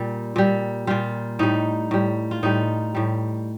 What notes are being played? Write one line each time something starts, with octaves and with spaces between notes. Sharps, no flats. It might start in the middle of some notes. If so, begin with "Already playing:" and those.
Already playing: A#2 G3
A#2 G3
A#2 G3 F4
A2 G3 D#4
A2 G3
F4
A2 G3 D#4
A2 G3